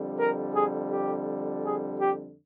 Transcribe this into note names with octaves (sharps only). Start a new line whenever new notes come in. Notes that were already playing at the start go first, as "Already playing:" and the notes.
Already playing: F2 D3 G3
A#4
G#4
G4
G#4
G4